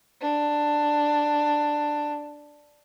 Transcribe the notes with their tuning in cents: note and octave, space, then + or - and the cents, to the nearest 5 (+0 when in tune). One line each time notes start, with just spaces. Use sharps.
D4 +10